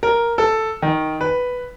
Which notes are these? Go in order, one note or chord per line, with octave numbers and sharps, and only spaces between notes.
A#4
A4
D#3
B4